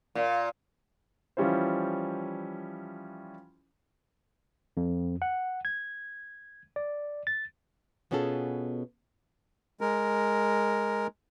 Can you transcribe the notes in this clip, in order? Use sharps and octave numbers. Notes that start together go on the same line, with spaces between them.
A#2
E3 F3 G3 C#4 E4 C5
F2
F#5
G#6
D5
A6
B2 B3 C#4 F4 G#4 A4
G#3 A#4